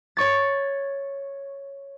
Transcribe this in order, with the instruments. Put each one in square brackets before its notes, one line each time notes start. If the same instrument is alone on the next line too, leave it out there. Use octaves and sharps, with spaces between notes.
[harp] C#5 C#6 A6